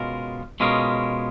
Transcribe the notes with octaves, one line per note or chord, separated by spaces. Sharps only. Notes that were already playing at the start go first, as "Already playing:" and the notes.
Already playing: B2 G#3 C#4 F4 A#4
B2 G#3 C#4 F4 A#4